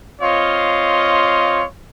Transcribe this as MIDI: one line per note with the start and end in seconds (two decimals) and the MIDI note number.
0.21 1.64 60
0.21 1.64 65
0.21 1.64 73
0.21 1.64 75
0.21 1.64 77
0.21 1.64 84